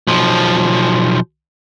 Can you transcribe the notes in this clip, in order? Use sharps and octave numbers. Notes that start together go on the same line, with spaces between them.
B1 F3